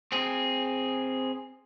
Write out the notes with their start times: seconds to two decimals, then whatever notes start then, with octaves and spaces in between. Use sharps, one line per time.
0.12 C4 G#4